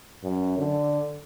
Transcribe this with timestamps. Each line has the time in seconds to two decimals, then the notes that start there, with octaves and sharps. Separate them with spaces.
0.23 F#2
0.58 D3